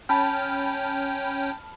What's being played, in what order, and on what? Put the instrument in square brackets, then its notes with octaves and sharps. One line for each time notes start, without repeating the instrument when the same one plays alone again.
[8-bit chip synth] C#4 G5 [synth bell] A5 B5 F6